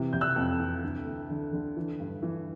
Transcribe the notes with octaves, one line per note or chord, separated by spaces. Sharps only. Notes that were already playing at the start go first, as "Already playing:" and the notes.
Already playing: C3 E3
C3 G6
E6 F#6
F2
E3
D2
D2
D3
D3
E3
G2
E3